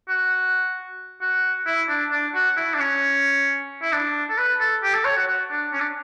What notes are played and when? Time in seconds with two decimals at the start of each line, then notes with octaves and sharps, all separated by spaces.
0.09 F#4
1.21 F#4
1.66 E4
1.89 D4
2.12 D4
2.35 F#4
2.57 E4
2.74 D4
2.79 C#4
3.83 E4
3.93 D4
4.30 A4
4.37 B4
4.60 A4
4.83 G4
4.94 A4
5.05 C#5
5.17 F#4
5.28 F#4
5.51 D4
5.73 C#4
5.80 D4